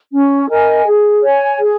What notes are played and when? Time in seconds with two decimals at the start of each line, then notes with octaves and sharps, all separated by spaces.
0.13 C#4
0.49 A#4 D#5 G#5
0.86 G#4
1.22 C#5 G#5
1.59 G#4